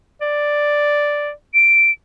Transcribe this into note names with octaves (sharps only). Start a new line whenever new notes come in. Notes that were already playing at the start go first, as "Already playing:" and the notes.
D5
D7